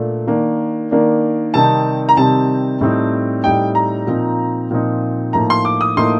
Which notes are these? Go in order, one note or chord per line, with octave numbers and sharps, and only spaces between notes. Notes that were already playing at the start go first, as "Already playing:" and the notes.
Already playing: A#2 A3 D4
D#3 A#3 D4
D#3 A#3 D4
C3 D#3 G3 C4 D#4 A5
A#5
C3 D#3 G3 C4 D#4 A5
A2 G3 C4 D#4
A2 G3 C4 D#4 G5
A#5
A#2 F3 C4 D#4
A#2 F3 C4 D#4
A2 F3 A#3 D#4 A#5
C6
D6
D#6
A2 F3 A#3 D#4 C6